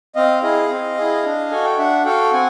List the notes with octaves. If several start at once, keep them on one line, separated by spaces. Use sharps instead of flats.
C4 D#5 F5
E4 G#4 D#5 F5
C4
E4 G#4
D4
F#4 A4 G#5
G5
D4 E5 F#5
F#4 A4 F5 G5
C4 F#5 G#5